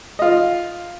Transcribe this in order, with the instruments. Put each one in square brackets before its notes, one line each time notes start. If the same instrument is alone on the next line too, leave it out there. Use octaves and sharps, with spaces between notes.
[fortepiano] F4 D#5